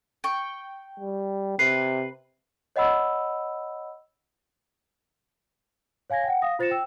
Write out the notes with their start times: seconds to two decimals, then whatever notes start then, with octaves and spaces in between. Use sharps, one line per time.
0.24 G5 C#6
1.00 G3
1.59 C3 B4 C7
2.76 C#5 D#5 F#5 B5 E6
6.10 C#5 F5 G#5 G#6 A#6
6.24 F#5 G5
6.42 F5 D#6 A#6
6.59 F4 C5 A6 A#6 C#7 E7
6.71 G5 E6